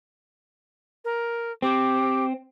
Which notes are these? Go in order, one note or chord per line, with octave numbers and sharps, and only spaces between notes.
A#4
C4 G4